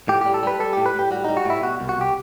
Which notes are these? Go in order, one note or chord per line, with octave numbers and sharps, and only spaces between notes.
A2 G4
G3 G4
A4
G3 B4
G3 A4
A2 G4
B4
A2 G4
G3 F#4
G3 D#4
F#4
A2 E4
B2 F#4
C2
F#4
C2 G4